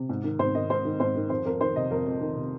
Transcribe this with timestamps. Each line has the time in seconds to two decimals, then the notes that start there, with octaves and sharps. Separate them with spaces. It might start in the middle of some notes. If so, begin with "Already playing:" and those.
Already playing: C3
0.09 G#2
0.24 D#3
0.39 G#2 C5
0.54 D#3 D#5
0.70 G#2 C5
0.85 D#3
1.00 G#2 C5
1.16 D#3
1.30 F2 C5
1.46 F2 A#4
1.60 D#3 C5
1.75 C3 D#5
1.91 F2 A#4
2.06 F2
2.21 D#3
2.36 C3